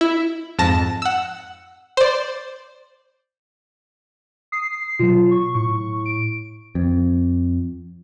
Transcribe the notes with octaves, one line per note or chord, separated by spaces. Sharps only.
E4
F2 G#2 A5 A#6
F#5 E6
C5 D5
D#6 C7
B2 F#3 F4
C#6
A2 C#6
D7
F2